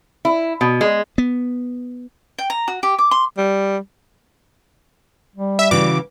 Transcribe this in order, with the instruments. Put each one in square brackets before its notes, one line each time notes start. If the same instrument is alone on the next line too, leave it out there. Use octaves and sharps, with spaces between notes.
[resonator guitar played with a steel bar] E4
B2
G#3
[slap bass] B3
[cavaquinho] G5
A#5
F#4
G4
D6
C6
[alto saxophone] G3
[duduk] G3
[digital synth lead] E5
[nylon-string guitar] C#3 E3 F#4 [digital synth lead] D6